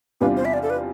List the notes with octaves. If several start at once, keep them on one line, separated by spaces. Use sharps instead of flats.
E2 C3 G3 D4 F4 B4
C5
E5
D5
A4
B4